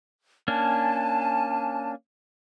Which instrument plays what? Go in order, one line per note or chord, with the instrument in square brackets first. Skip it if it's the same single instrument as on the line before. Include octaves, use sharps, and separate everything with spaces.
[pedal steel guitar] A#3 C#4 D4 [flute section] G#5 A5